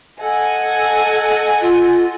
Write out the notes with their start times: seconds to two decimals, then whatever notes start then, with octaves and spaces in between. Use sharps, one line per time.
0.20 A4 D#5 F#5 G#5
1.61 F4